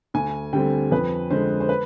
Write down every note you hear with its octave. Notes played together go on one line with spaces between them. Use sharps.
D2 G#5
D3 G3 C4 G5
F2 B4
D3 G#3 C5
C5
B4